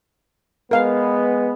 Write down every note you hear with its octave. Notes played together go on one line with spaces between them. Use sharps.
G#3 B3 A#4 F5